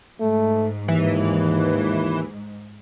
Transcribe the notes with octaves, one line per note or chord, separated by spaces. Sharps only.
G#2 A3
D#2 E3